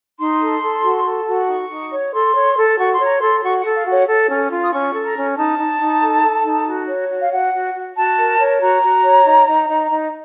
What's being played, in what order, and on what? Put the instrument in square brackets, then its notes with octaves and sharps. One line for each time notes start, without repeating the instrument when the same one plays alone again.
[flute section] D#4 C6
A4
A4
F#4
A4
F#4
D#4 C#6
D#4
C#5
A4 C6
C#5
A4
F#4 C#6
C6
C#5
A#5
A4 C6
F#4 C#6
A4 F#5
F5
F#4
C#5
A4
C#4
F4
D#6
C#4 C#6
A4
A#5
C#4
D#4 A5
D#4
D#4
A4
A4
D#4
F#4
C#5
F#4
F5
F#4 F#5
F#4
F#4
F#4 A5
A#4
C#5
F#4 A#5
F#4
C#5
D#4
D#4
D#4
D#4